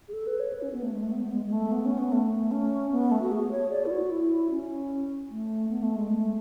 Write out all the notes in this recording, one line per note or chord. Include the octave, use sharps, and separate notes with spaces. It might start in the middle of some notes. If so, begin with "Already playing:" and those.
G#4
A4
B4
C#5
B4
C#4
B3
A3
G#3
A3
B3
B3
G#3
G#3
A3
B3
C#4
B3
A3
C#4
B3
A3
F#4
G#4
C#5
D5
E4
F#4
E4
C#4
A3
B3
A3
G#3
A3